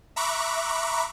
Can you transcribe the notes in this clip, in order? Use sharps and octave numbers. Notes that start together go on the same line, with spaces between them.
E5 A#5 B5 C#6 D6 F#6